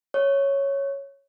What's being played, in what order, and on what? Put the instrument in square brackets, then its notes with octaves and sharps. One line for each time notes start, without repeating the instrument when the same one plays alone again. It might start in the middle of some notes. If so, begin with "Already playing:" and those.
[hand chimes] C#5